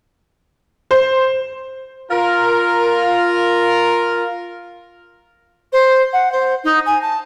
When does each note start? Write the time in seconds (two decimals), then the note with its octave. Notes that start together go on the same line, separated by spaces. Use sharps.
0.91 C5
2.11 F4 A#4
5.72 C5
6.13 F#5
6.32 C5
6.63 D#4
6.86 G#5
7.02 A5